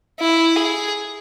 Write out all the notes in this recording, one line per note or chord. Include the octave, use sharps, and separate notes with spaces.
E4
G#4